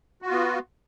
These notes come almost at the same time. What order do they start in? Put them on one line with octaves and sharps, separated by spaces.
F#4 F4 B3